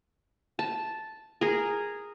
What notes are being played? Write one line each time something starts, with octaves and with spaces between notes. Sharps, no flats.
A5
G#4 A#4